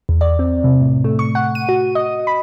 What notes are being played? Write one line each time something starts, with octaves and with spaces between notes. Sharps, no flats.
E2
D5
C4
C3
A2
A3
C#6
F#5
D#7
F#4
D#5
B5